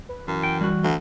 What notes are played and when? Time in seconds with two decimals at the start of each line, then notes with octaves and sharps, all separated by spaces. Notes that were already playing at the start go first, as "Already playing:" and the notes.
0.09 B4
0.28 F#2 E3
0.43 G5
0.61 G3 F#4
0.83 D2